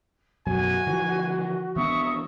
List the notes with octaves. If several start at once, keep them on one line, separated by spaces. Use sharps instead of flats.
F#2 B2 F#3 F#4 G#5
D3 E3 F3
E3 B3 D4 E5 A#5 C#6 D#6